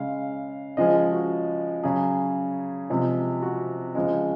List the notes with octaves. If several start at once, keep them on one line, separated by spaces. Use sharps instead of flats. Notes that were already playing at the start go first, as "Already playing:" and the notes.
Already playing: C#3 G#3 F5
C#3 F3 G#3 D#5
G#4
F#4
C#3 F#3 G#4
C3 F3 G#3
F#4
C#3 F3 G#3